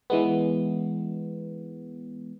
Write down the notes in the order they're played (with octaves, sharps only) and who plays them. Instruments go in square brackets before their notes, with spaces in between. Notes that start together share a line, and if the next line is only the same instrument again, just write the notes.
[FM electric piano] E3 G#3 B3